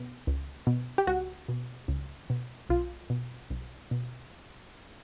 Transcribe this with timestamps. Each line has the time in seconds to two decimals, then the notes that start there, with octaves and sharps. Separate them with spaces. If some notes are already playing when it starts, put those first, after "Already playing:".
Already playing: B2
0.27 C#2
0.67 B2
0.98 G4
1.07 C#2 F#4
1.48 B2
1.88 C#2
2.30 B2
2.70 B1 F4
3.10 B2
3.50 B1
3.91 B2